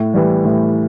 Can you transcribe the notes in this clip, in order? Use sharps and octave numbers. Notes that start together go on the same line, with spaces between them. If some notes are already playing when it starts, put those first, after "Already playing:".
Already playing: A2
E3 G3
A2